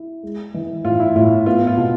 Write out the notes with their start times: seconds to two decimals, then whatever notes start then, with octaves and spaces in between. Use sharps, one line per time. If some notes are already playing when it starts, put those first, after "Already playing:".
Already playing: E4
0.23 G#3
0.54 E3
0.84 A2 F4
1.00 E4
1.16 A2 F4
1.46 B3 F4
1.67 F4
1.77 B2